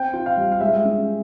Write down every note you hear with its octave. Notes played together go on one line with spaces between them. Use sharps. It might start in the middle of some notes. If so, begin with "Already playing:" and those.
Already playing: C4 G5
F4
F5
G3
F5
G#3 E5
C#4